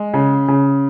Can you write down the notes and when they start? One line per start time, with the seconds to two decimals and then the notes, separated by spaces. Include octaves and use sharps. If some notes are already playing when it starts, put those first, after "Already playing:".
Already playing: G#3
0.14 C#3
0.48 C#3